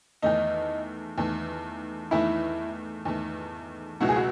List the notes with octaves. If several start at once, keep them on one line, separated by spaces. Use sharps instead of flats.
E2 D#3 A3 D#4
E2 D#3 A3
E2 D#3 A3 E4
E2 D#3 A3
C#2 B2 F#3 A3 E4 F#4
G#4
F#4